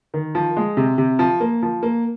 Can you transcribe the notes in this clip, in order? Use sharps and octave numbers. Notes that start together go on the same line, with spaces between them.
D#3
F3
G#3
C3
C3
F3
A#3
F3
A#3